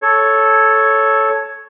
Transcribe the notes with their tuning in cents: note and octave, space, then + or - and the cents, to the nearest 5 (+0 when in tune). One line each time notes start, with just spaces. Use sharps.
A4 -5 C#5 +0